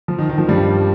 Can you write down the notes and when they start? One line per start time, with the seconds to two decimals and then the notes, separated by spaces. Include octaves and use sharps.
0.08 F3
0.18 D#3
0.29 D#3
0.38 F3
0.49 G2 G3